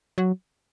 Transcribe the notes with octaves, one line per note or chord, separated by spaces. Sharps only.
F#3